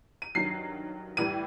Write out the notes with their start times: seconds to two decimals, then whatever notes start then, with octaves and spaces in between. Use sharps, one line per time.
0.22 D#7
0.35 G2 D#3 F#3 C7
1.17 A2 E3 G3 D#7